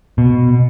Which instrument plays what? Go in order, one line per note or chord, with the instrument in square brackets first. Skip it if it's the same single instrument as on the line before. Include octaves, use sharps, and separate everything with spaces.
[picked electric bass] B2